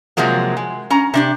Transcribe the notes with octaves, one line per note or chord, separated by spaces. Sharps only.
C3 F3 F#3 G#3 A#3
G#3
C#4 A#5
C3 D4 G4